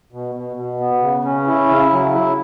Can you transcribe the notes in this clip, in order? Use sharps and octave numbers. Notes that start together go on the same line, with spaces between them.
B2
B2
B2
B3
C#3
C#4
E4
C#3
F#3
E4